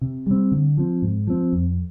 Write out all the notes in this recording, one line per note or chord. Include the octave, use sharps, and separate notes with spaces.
C3
G3 C4
D3
F3 C4
G#2
F3 C4
F2